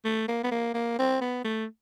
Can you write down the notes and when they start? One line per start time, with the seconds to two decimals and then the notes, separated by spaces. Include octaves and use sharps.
0.05 A3
0.28 A#3
0.44 B3
0.51 A#3
0.74 A#3
0.99 C4
1.21 B3
1.44 A3